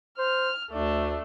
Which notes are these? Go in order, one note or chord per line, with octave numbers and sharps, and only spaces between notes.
C5 F6
D2 A3 D4